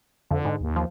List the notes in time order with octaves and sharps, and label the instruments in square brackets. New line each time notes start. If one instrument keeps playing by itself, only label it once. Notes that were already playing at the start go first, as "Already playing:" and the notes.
[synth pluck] F2 [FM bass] D3
[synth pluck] G#2
[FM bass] D#2
[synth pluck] F3